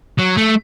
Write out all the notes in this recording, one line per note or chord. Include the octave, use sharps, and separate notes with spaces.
F#3
A3